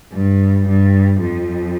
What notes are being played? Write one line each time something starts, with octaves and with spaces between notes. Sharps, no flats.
G2
G2
F2